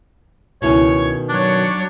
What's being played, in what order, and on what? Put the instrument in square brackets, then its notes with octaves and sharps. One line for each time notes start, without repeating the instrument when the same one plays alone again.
[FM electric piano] C#2 E4 G#6 [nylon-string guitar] B2 D#3 C#4 [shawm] C#5
[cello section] F#3 C#5 [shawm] D4 [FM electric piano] F#6